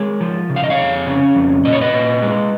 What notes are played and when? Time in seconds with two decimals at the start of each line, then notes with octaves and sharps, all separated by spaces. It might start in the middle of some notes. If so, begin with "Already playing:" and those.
Already playing: G#3 A#4 C#5
0.21 F3
0.49 C#3
0.56 F5
0.64 D#5
0.70 C#5 F5
0.78 F2
1.06 C#3
1.35 F2
1.65 A#2 D#5
1.73 C#5
1.81 B4 D#5
1.93 A#2
2.22 G#3